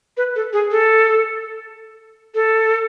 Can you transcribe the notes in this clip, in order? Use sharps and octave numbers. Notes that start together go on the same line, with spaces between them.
B4
A4
G#4
A4
A4